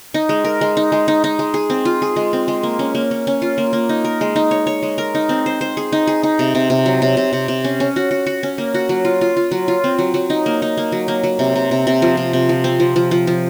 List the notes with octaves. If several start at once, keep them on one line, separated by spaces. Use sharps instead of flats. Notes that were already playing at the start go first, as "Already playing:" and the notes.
D#4
G#3
A#4
G#3
D#4
G#3
D#4
D#4
G#3
G#4
C4
F4
G#4
G#3
C4
G#3
A#3
C#4
A#3
C#4
C#4
F4
A#3
A#3
D#4
A#4
G#3
D#4
C#5
C#5
G#3
A#4
D#4
C4
C5
C5
G#4
D#4
G#4
D#4
C3
C3
C3
F#3
C3
C3
C3
C3
C#4
C#4
F#4
F#4
F#4
C#4
A#3
F#4
F#3
F4
F4
F4
F#3
F4
C4
F#3
F#3
D#4
A#3
D#4
A#3
F#3
A#3
F#3
C3
C3
C3
C3
F3
C3
C3
F3
C4
F3
F3
F3
F3